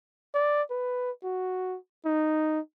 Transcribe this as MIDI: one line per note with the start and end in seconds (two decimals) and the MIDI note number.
0.35 0.63 74
0.70 1.11 71
1.23 1.77 66
2.05 2.60 63